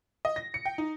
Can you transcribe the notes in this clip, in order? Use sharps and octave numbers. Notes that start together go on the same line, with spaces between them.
D#5
A#6
C#7
G5
D#4